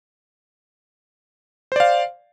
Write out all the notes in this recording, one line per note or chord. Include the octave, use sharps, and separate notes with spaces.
C5 D5 F5